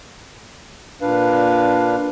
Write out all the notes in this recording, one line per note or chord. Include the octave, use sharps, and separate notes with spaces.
A#2 D4 B4 F5